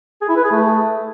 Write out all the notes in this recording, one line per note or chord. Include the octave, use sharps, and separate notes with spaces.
G#4
E4
B4
G#4
A3